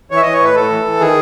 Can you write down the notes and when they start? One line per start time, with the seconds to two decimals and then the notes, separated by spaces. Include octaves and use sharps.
0.11 E3 C#5
0.17 E5
0.22 E3 D#5
0.33 C#5
0.40 A2 B4
0.55 A2 A4
0.70 E3
0.85 E3
1.00 D#3 G#4